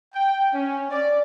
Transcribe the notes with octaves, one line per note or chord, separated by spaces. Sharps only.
G5
C#4
D5